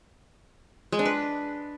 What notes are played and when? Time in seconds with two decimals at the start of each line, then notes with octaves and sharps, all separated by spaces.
0.92 G#3
0.99 D4
1.05 B4